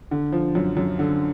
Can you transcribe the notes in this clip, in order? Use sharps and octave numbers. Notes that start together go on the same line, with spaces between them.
D3
F3
F#2
F#2
D3